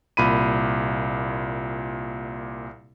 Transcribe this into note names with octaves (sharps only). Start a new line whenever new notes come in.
C2 A#2 B5 D#7